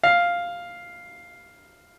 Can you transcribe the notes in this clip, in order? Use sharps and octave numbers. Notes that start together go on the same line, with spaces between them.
F5